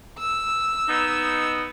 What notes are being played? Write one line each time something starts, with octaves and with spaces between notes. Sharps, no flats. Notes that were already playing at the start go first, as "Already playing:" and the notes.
E6
B3 D#4